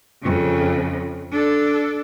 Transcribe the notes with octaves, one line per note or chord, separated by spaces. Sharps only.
F2 C#3
D4 A4